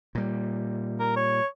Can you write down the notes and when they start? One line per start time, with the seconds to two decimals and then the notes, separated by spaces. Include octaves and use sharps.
0.15 A#2 G3
1.00 A#4
1.16 C#5